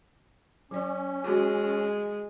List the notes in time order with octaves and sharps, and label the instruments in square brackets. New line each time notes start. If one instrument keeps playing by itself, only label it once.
[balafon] F#3 D5 [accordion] C#4
[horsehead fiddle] G#3 [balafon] F#4